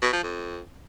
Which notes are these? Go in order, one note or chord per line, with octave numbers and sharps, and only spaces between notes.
B2
F3
F2